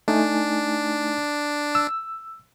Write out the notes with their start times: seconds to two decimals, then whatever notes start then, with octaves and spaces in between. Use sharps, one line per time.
0.08 A3 D4 D#4 G#5
1.75 E6